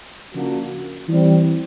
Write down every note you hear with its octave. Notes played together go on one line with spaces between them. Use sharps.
C#3 F3 A#3 D4 F#4
E3 G3 C4